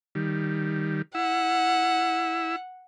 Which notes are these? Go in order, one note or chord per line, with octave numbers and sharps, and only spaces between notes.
D#3 G3
E4 F#5 E6